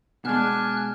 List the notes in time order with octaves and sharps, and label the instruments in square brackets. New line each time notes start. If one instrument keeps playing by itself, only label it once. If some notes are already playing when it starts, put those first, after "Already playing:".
[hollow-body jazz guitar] B2 G#3 [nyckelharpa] D4 G#5 [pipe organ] F6 F#6